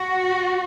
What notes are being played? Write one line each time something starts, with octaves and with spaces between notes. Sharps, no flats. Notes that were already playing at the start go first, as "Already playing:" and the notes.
Already playing: F#4